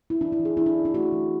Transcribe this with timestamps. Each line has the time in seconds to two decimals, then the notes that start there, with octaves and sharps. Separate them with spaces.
0.10 E4
0.21 E3 D4
0.32 E4
0.40 E3
0.45 G#4
0.57 C#4 E4
0.66 D4
0.76 C#4
0.85 D4
0.94 A3 F#4
1.12 E3